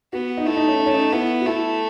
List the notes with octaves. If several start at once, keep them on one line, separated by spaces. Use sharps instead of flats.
B3 F#4
D#4
A3 E4
D#4
C#4
D#4
C#4
D#4
B3 E4
F#4
A3 E4